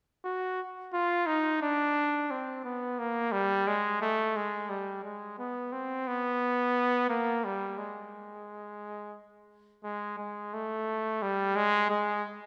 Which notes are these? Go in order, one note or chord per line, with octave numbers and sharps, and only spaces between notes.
F#4
F4
D#4
D4
C4
B3
A#3
G3
G#3
A3
G#3
G3
G#3
B3
C4
B3
A#3
G3
G#3
G#3
G#3
A3
G3
G#3
G#3